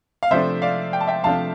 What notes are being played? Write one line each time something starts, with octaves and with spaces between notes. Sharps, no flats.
F5
C3 F3 A3 D4 C5 E5
D5 F5
G5
A5
E5 G5
C3 F3 A3 D4 F5 A5